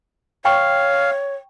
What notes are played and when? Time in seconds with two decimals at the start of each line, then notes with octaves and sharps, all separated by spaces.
0.45 C#5 F5 G5 C#6